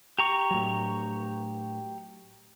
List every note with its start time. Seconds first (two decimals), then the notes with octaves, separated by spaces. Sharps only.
0.19 G4 A#5 C#6
0.51 A2 F#3